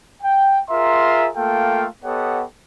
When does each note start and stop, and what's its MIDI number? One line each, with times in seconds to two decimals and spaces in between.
0.22 0.59 79
0.70 1.28 65
0.70 1.28 68
0.70 1.28 70
0.70 1.28 76
0.70 1.28 82
0.70 1.28 84
1.37 1.87 57
1.37 1.87 58
1.37 1.87 65
1.37 1.87 69
1.37 1.87 77
1.37 1.87 79
2.04 2.44 59
2.04 2.44 67
2.04 2.44 69
2.04 2.44 73
2.04 2.44 75
2.04 2.44 78